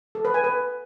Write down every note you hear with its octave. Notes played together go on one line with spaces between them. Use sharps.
A4
B4
G#5
B4